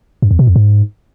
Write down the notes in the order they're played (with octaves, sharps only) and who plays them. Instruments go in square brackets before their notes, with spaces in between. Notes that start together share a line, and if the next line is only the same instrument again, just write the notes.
[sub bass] G2
E2
B2
F2
G#2